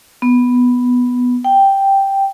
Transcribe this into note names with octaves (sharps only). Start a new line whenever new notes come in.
B3
G5